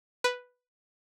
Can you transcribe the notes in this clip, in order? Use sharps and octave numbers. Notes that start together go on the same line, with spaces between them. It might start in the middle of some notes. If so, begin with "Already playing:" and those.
B4